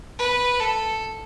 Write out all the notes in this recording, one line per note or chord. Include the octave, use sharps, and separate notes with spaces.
B4
A4